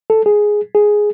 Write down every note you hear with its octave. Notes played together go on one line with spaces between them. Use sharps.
A4
G#4
G#4